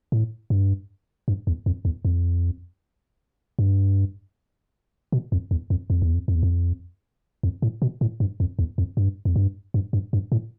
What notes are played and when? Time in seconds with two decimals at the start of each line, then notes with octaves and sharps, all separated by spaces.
0.12 A2
0.50 G2
1.28 G2
1.47 E2
1.66 F2
1.85 E2
2.05 F2
3.59 G2
5.12 B2
5.32 F2
5.51 E2
5.70 F2
5.90 F2
6.02 E2
6.14 F2
6.28 F2
6.35 E2
6.43 F2
7.43 F2
7.62 A2
7.82 B2
8.01 A2
8.20 G2
8.40 F2
8.59 E2
8.78 F2
8.97 G2
9.25 F2
9.36 G2
9.74 G2
9.93 G2
10.13 G2
10.32 A2